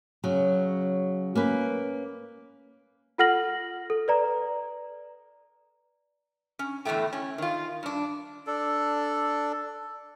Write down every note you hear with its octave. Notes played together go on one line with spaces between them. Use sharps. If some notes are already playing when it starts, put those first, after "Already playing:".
C#3 F#3
A#3 C#4 B4
F4 A4 F#5 F6 A#6 F#7
A4
B4 D5 A#5
C#4
E2 A2 D3 E3 A3 G5
C#4
D#3 F4
G2 D4
D4 A4